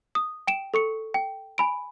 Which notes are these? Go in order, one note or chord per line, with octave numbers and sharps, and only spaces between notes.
D#6
G5 D7 E7
A4 C#6 C#7
G5
G#5 B5 D7